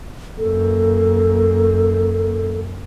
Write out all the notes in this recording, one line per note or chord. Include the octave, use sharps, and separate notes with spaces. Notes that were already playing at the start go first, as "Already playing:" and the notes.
F#2 A#3 A4